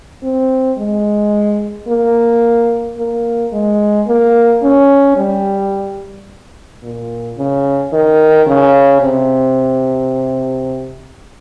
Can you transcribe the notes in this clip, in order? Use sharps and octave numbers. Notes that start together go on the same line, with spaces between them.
C4
G#3
A#3
A#3
G#3
A#3
C#4
G3
A#2
C#3
D#3
C#3
C3